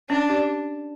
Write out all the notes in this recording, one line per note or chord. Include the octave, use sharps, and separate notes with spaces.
C#4 D4
G4 D5